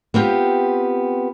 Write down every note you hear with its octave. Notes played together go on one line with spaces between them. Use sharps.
B3 C4 F4 G4